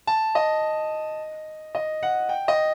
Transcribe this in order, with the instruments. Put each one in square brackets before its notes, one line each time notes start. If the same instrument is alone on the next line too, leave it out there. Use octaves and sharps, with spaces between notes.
[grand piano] A5
D#5
D#5
F#5
G5
D#5